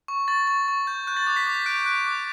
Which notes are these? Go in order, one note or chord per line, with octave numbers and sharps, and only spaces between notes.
C#6
C#6 A6
C#6
C#6
G6
F#6 G6
A6
D6 A6
B6
D6 B6
F#6 D7
F#6 D7
D6